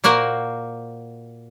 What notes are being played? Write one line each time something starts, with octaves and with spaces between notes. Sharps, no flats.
A#2 A#3 F#4 A#4 C5